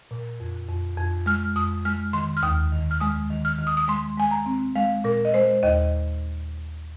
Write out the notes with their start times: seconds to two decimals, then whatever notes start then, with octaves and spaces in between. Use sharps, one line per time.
0.11 A#2
0.40 F2
0.69 F2
0.97 F2
1.26 G#3 F6
1.56 F2 D#6
1.85 G#3 F6
2.13 D#3 C6
2.37 F6
2.43 D#2 D#6
2.72 D#3
2.91 F6
3.00 G#3 D#6
3.30 D#3
3.45 F6
3.59 D#3
3.67 D#6
3.77 D#6
3.88 G#3 C6
4.17 G#3 G#5
4.31 A#5
4.46 C4
4.76 G#3 F5
5.04 A#2 A#4
5.25 D#5
5.34 G#3 C5
5.63 D#2 D#5